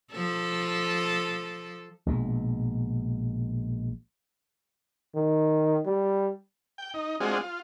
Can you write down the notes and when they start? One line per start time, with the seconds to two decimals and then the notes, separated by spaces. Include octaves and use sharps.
0.12 F3 A4
2.06 A#1 B2 G#3
5.15 D#3
5.86 G3
6.78 G5
6.94 D#4
7.20 G#3 C4 D4 F4 F#4 G#4
7.41 F4